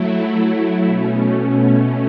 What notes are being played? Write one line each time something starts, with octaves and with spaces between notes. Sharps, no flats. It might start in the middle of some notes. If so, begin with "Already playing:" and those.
Already playing: F#3 A3 E4
B2 A3 C#4